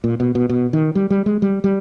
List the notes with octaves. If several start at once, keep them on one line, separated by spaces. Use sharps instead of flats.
A#2
B2
B2
B2
D#3
G3
G3
G#3
G3
G3